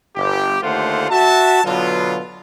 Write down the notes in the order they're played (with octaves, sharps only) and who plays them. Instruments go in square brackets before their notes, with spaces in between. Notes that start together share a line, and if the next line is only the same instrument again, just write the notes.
[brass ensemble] G1 G4
D#2 D3 A3 F4 C5 F#5
F#4 E5 A5
B2 D3 F#3 B3 F4